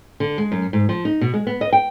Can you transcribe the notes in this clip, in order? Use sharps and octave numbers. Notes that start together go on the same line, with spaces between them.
D3
G#3
F#2
G#2
F3
D#4
B2
G#3
B3
D#5
G5